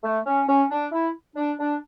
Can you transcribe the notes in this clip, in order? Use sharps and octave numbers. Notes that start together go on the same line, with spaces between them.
A3
C#4
C#4
D4
E4
D4
D4